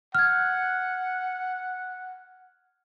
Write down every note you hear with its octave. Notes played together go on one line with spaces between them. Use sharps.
F#5 F6 G#6